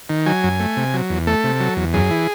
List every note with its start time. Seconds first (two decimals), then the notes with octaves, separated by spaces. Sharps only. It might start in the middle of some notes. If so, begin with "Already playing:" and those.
0.09 D#3
0.26 F#3 G#5
0.43 F#2
0.60 A3
0.77 C3
0.94 F#3
1.10 E2
1.27 A3 A4
1.44 C3
1.60 F#3
1.77 E2
1.93 F#2 G#4
2.10 E3